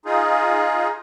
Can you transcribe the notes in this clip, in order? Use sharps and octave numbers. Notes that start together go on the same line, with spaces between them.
D#4 F4 G#4